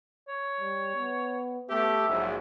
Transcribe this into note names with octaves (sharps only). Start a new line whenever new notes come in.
C#5
G3
B3
A3 B3 G4 E5
A#1 G#2 F#3